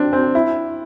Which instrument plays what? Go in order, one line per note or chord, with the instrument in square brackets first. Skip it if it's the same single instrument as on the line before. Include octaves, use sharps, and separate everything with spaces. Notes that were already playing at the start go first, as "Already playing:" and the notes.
Already playing: [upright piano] C4 D4
C4
E4